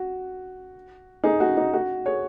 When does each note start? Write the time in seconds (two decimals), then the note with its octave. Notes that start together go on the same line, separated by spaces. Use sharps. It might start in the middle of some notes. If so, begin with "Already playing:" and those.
Already playing: F#4
1.24 D#4 G#4
1.40 F#4
1.57 D#4
1.74 F#4
2.06 G#4 C#5